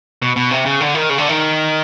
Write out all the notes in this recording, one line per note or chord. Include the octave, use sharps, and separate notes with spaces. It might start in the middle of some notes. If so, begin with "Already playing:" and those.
B2
B2
C3
C#3
D3
D#3
C#3
D3
D#3